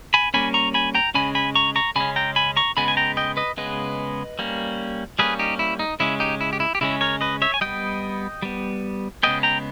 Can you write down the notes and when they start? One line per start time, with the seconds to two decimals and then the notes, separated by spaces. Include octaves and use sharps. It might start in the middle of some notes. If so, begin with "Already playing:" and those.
0.14 G#5 B5
0.34 G3 A#3 C#4 G#5 B5
0.54 A#5 C#6
0.74 G#5 B5
0.95 G5 A#5
1.14 C#3 G#3 C#4 G#5 B5
1.35 G#5 B5
1.55 A#5 C#6
1.76 A#5 C#6
1.96 C#3 G#3 C#4 G#5 B5
2.16 G5 A#5
2.36 G#5 B5
2.57 A#5 C#6
2.77 C#3 G#3 B3 G#5 B5
2.88 G#5
2.97 G5 A#5
3.17 D#5 G5
3.37 B4 D#5
3.57 C#3 G#3 B3 B4 D#5
4.39 G3 A#3 C#4
5.19 G3 A#3 C#4 G#4 B4
5.39 D#4 G4
5.59 E4
5.79 D#4
6.00 C#3 G#3 C#4 E4
6.20 D#4 G4
6.41 E4
6.53 G4
6.60 E4
6.75 G4
6.81 C#3 G#3 C#4 E4
7.01 A#4 C#5
7.21 B4 D#5
7.42 C#5 E5
7.54 G#5
7.61 G3 B3 D#5 G5
8.42 G3 B3
9.23 C#3 G#3 B3 D#5 G5
9.43 G5 A#5